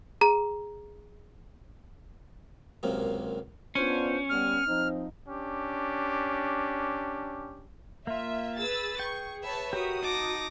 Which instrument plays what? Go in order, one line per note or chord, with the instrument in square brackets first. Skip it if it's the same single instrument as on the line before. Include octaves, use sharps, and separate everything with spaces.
[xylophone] G#4 A#5
[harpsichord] C#2 F#2 C3 A#3
[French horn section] B3 D4 F4 [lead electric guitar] C#4 [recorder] C5
[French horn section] G3 B3 [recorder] F6
[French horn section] F3 C4 D#4
[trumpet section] C#4 D4 G4
[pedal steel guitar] A#3 F4 [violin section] E5
[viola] G#4 [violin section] B4 E6 A6
[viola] G#4 [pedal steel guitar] G5 [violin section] C#6
[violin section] B4 C#5 A5 [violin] E5
[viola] F#4 [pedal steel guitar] G4 A#4 C#5 [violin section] D#6
[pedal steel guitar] D#4 A5 [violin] D6 A#6